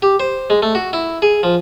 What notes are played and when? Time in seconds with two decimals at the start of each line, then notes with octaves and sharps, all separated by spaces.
0.02 G4
0.20 C5
0.50 G#3
0.62 A3
0.75 F#4
0.93 E4
1.22 G#4
1.43 F3